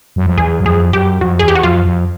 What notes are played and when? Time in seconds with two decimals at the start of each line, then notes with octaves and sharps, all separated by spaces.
0.16 F#2
0.26 F2
0.37 E2 G#4
0.60 F#2
0.65 F2 G#4
0.93 F#2 G4
1.21 F2 F#4
1.39 G#4
1.43 E2
1.48 G4
1.55 F#4
1.63 F2 F4
1.85 F2